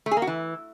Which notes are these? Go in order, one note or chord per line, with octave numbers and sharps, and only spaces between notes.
A3
G#4
A#3
F#4
E3